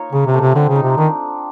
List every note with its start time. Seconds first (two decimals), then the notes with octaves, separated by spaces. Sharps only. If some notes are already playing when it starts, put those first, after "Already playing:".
Already playing: A#3 D#4 F4 C#5
0.12 C#3 C#4
0.27 C3
0.34 A3
0.40 C3
0.55 D3 C4
0.69 C#3
0.76 D#4
0.83 C3
0.98 D#3 D4